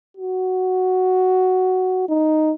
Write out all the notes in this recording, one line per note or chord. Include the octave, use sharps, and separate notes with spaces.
F#4
D#4